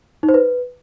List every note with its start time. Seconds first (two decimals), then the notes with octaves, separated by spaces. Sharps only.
0.23 D#4
0.29 C5
0.34 B4